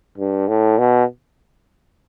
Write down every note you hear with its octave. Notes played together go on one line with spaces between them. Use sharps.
G2
A2
B2